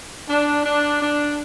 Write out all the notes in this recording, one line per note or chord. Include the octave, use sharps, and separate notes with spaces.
D4
D4
D4